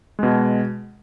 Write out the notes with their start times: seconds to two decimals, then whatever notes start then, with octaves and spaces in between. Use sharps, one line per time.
0.19 B2 G#3